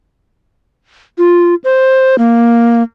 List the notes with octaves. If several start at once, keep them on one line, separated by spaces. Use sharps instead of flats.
F4
C5
A#3